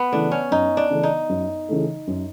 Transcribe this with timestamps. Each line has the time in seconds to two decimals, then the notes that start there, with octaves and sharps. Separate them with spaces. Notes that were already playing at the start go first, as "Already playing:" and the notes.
Already playing: B3
0.12 C#3 E3 A3 D4
0.31 C#4
0.51 F#2 D#4
0.77 D4
0.90 C#3 E3 A3
1.03 D#4
1.29 F#2
1.69 C#3 E3 A3
2.07 F#2